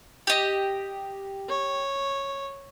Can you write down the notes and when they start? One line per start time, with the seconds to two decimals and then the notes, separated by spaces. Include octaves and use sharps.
0.27 G4 D#5
1.49 C#5